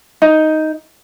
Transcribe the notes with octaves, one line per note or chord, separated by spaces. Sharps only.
D#4